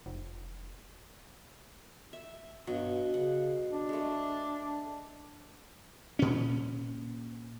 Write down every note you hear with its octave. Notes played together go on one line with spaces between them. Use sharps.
F1
E5
G2 B2 F#3
C#3 F#5
D4
G#3 A3
A#2 C#4